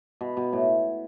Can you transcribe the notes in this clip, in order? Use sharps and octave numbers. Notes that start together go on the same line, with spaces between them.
B2
B2
A2